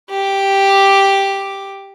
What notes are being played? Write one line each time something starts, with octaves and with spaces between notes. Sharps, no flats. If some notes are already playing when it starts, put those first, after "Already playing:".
G4 D6